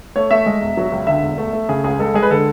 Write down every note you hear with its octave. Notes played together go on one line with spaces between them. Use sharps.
A3 C#5
A3 E5
G#3
E1
F#3
C#2
D3 E5
E1
A3
A3
C#3 G#4
C#2 G#4
G#3 A4
G#3 G#4
B4
D3 A4